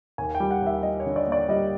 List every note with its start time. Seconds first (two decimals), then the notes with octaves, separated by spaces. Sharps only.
0.18 D#2 G#5
0.35 G5
0.40 G3
0.51 F#5
0.62 D#2 E5
0.83 G3 D#5
1.00 C#5
1.06 D3
1.16 D5
1.28 A#3 D5
1.48 G3 D#5